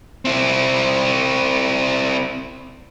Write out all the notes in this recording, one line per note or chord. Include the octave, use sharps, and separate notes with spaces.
C4 E4